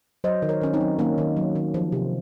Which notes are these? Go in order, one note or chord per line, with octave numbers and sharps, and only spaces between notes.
F#3 C5 D#5
D#3
A#4 C#5
D#3 C#4
C4 D#4
F#3
D#3 A#3 C#4
D#3
F#3
D#3
F3
C3